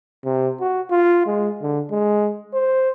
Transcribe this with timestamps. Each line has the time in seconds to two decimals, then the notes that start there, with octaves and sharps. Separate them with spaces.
0.24 C3
0.60 F#4
0.90 F4
1.26 G#3
1.62 D3
1.91 G#3
2.54 C5